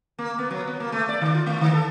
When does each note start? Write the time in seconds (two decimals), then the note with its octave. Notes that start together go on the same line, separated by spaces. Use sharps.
0.19 A#3
0.39 B3
0.51 F#3
0.67 B3
0.80 A#3
0.92 A3
1.09 D5
1.21 D#3
1.34 F4
1.46 A3
1.61 D#3
1.73 A4